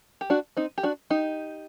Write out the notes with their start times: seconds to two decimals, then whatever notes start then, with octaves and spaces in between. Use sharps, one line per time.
0.21 G4
0.30 D4 F#4
0.57 C4 D#4
0.78 G4
0.83 D4 F#4
1.10 D#4 G4